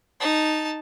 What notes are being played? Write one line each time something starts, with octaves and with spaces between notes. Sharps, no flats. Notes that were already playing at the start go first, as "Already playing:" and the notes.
D#4 A5